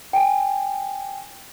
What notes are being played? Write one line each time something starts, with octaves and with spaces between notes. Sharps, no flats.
G5 G#5